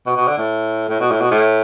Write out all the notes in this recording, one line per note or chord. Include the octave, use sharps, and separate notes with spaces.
B2
B2
D3
A2
A2
B2
A2
B2
A2